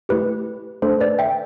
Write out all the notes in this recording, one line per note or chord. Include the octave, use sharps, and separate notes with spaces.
A3 E4 G4 B4
A3 D4 A4 C5
B4 D5
E5 G5